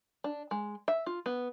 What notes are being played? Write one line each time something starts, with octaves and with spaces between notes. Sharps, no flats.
D4
G#3
E5
F4
B3